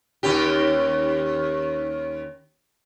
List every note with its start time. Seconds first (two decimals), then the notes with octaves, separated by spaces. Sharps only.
0.23 D#2 C#4 G4